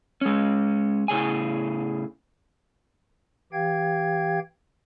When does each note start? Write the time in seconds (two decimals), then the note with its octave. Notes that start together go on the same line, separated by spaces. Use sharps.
0.21 G#3 C#4
1.08 A2 C#3 G#4 G#5
3.53 E3 G4 F5 G5 G#6